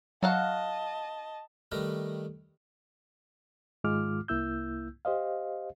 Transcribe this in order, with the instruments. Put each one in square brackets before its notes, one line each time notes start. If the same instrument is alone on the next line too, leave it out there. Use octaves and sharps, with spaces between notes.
[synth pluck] F#3 [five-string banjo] F#4 F5 F#5 [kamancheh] D#5 A5
[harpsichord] D#3 G3 A3 D#4 A#4 B4
[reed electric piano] G#2 D#3 G#3 F4 D6 F6
C2 A#3 E4 E6 G6
G4 C5 D#5 F5